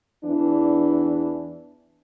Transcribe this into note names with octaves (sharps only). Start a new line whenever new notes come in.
E2 E3 D4